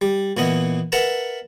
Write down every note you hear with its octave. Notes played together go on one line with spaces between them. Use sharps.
G3
A#2 E3 B3 D#5
A#4 B4 E5 F#5 A5 A#5